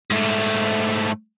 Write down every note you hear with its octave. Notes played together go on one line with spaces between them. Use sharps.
G#2 A3